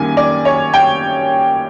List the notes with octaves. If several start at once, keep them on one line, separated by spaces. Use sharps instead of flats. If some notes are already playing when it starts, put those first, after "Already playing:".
Already playing: F#2 D#3 G3 A#3 G#5
D5
C#5
G5